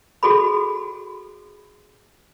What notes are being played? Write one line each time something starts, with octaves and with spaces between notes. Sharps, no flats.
F#4 G#4 A4 B5